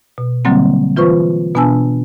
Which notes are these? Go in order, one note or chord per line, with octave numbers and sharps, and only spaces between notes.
B2
D3 F#3 G3 A#3 C4
E3 F4 B4 C5 C#6
B2 B3 D4 G#5 A5 E6